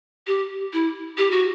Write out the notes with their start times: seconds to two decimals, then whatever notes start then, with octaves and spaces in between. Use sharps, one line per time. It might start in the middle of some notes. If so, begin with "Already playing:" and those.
0.27 G4
0.73 E4
1.18 G4
1.31 F#4